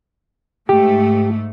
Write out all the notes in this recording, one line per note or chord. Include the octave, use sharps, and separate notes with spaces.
G#2 A3 G4